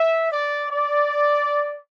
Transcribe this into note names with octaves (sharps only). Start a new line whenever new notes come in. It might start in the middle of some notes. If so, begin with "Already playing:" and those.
Already playing: E5
D5
D5